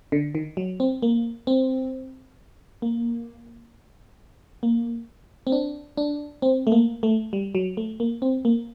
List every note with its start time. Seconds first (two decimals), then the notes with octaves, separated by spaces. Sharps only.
0.12 D3
0.35 D#3
0.57 F#3
0.80 C4
1.02 A#3
1.47 C4
2.82 A#3
4.63 A#3
5.47 C4
5.52 D4
5.97 D4
6.42 C4
6.67 A3
6.72 A#3
7.03 A3
7.33 G3
7.55 F#3
7.77 A3
8.00 A#3
8.22 C4
8.45 A#3